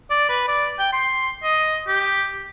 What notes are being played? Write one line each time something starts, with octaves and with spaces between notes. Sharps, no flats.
D5
B4
D5
G5
C6
D#5
G4